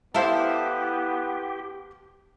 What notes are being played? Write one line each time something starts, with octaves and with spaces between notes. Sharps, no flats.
B3 E4 G4 A4 C5 E5 F5 A5